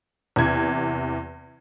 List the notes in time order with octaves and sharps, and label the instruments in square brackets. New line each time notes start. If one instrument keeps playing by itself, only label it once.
[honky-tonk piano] E2 C3 G#6